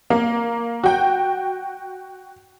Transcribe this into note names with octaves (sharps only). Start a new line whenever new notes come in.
A#3
F#4 G5